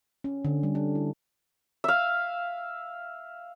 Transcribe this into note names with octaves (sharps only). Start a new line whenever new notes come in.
C#4
D3
G3
D4
E4
E5 F5